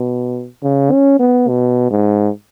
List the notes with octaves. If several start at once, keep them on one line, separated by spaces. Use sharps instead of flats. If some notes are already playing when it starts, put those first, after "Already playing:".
Already playing: B2
C#3
C#4
B3
B2
G#2